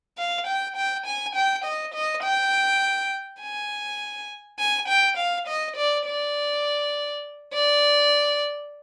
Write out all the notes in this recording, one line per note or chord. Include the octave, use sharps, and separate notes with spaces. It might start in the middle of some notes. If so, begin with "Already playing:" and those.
F5
G5
G5
G#5
G5
D#5
D#5
G5
G#5
G#5
G5
F5
D#5
D5
D5
D5